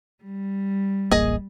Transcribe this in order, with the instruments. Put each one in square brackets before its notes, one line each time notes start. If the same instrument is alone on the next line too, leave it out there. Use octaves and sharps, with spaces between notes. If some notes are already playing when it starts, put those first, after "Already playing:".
[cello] G3
[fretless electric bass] D1 A1 A#3 [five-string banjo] G#4 D#5